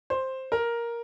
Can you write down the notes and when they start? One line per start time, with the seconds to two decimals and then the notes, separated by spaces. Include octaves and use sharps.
0.10 C5
0.52 A#4